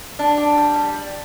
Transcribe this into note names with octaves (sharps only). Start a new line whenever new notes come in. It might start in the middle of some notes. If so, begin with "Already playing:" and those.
D4
G4
G3
G3